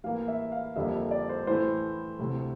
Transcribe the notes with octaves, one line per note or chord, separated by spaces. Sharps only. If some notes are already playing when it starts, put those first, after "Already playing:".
A2 E3 A#3 F5
E5
F5
F2 D3 G3 A#3 E5
D5
C5
A2 E3 A3 C5
D2 C3 E3 A3